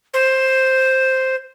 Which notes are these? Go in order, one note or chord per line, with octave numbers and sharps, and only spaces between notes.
C5